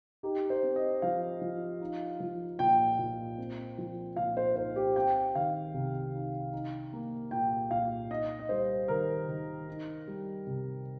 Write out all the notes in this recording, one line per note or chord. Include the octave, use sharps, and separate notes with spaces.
D#4 G4
C5
C4
D#5
F3 F5
F3
D#4
F3
A#2 G5
A#2
C4
F3
A#2 F5
C5
D#4 C5
G4
C4 G5
D#3 F5
C3
D#4
D#4
A#3
A#2 G5
A#2 F5
D#4 D#5
D#5
G3 C5
D#3 A#4
D#3
D#4
G3
C3